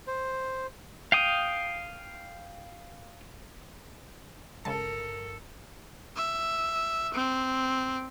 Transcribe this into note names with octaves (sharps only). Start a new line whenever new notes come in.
C5
F5 G5 D#6
G1 C#3 G#3 A4 A#4 A5
E5
C4